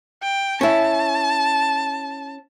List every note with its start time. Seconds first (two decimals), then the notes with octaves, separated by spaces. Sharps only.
0.23 G5
0.61 C#4 E4 A5